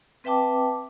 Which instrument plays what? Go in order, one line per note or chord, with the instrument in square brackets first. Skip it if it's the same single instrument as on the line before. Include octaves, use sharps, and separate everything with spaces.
[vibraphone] C4 B4 E5 G5 A5 D6